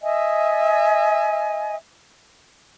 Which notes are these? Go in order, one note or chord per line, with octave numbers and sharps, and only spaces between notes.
D#5 E5 G#5